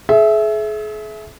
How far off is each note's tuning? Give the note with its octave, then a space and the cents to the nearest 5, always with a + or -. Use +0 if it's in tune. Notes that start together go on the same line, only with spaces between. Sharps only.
G#4 +40 E5 +0